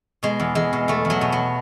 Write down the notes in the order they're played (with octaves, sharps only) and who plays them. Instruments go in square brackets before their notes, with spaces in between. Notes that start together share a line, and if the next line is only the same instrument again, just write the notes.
[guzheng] B2 G#3
E2
E2 G#3
B2
E2 A3
E2
F#3
B2
F#3